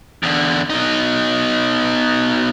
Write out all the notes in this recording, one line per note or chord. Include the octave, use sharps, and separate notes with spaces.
E2 D3
B2 D#4